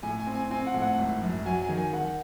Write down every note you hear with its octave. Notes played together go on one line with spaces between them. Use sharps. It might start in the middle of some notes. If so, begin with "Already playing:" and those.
A2 G#5
G#5
C4
G#5
C4 G#5
F#5
A2
F#5
G#1
F#2
F#3 G#5
G#5
D#3
G#5
D#3 F#5